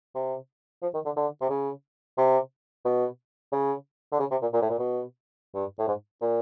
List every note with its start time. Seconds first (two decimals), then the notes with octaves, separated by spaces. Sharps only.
0.15 C3
0.82 F3
0.94 D#3
1.05 D3
1.16 D3
1.41 C3
1.50 C#3
2.18 C3
2.85 B2
3.52 C#3
4.12 D3
4.20 C#3
4.31 C3
4.42 A#2
4.53 A#2
4.62 A2
4.70 A#2
4.79 B2
5.54 G2
5.79 A2
5.88 G#2
6.22 A#2